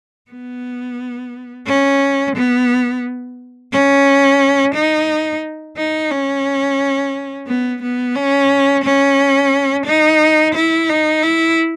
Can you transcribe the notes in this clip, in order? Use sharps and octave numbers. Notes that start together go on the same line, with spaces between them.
B3
C#4
B3
C#4
D#4
D#4
C#4
B3
B3
C#4
C#4
D#4
E4
D#4
E4